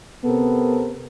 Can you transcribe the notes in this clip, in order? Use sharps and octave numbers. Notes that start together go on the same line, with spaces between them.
C3 B3 C4 A4 A#4